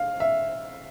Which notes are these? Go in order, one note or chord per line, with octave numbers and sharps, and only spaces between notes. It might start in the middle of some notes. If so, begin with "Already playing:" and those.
Already playing: F5
E5